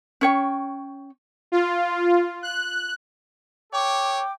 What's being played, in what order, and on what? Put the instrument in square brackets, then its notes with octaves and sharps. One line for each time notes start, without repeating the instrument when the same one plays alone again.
[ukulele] C#4 C#5 G5
[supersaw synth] F4
F#6
[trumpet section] A4 C#5 [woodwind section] G5 D6